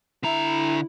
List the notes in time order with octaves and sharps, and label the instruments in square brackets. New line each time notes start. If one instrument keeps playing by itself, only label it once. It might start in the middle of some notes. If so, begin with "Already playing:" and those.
[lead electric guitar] D3 A#5 [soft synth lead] E4